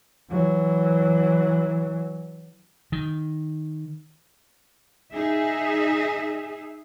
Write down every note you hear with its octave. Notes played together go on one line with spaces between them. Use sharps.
E3 F#3
D#3
D#4 G#4 E5